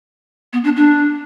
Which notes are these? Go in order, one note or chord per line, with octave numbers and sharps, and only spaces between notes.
B3
D4
D4